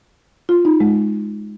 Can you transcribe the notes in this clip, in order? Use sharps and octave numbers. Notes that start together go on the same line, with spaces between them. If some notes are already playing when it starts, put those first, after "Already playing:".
F4
D#4
G#3